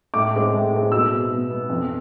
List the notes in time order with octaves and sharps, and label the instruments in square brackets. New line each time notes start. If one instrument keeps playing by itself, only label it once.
[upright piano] A2 D6
G#3 C4
A2
G#3 C4
B2 E6
B3
B2
B3
F2